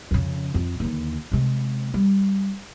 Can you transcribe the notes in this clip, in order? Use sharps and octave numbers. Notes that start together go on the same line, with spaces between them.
F2 C#3
F2
D#2 D3
C3 G#3
G3